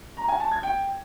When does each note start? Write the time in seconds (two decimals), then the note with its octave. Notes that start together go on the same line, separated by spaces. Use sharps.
0.17 A#5
0.28 G#5
0.40 A5
0.52 G#6
0.63 G5